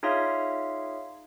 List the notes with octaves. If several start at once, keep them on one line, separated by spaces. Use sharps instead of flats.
D#4 F4 G#4 C#5 E5 F5